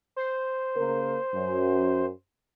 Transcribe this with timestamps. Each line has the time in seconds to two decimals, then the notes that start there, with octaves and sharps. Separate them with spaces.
0.16 C5
0.75 C#3 A#3 A#4
1.33 F#2